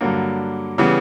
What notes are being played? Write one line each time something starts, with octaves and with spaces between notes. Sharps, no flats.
G2 D3 F#3 A#3
C#3 E3 G3 B3